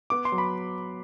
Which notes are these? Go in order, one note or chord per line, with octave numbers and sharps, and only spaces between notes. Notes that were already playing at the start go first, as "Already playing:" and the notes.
B3 D6
C6
F#3
B5